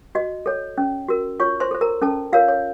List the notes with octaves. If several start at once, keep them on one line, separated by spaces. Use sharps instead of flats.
F#4 D#5
A4 C#5
C#4
F#4 A#4
F4 C#5 C#6
C5 C6
A4 C5
A#4 A#5
C#4 A4 A5
F4 A#4 C#5 F5
C#5